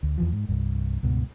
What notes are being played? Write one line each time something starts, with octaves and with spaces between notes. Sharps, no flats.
D2
E2 E3 F3
G#2
C2 G2
C#2 G2 B2